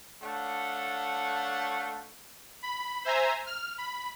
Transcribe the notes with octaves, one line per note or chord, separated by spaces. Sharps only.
A3 D4 C#5 F5 F#5
B5
C5 E5 G#5 A#5
F6
B5